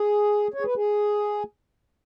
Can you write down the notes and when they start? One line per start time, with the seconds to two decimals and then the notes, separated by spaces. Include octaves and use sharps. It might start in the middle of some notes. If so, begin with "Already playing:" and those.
Already playing: G#4
0.54 C#5
0.61 G#4
0.65 B4
0.76 G#4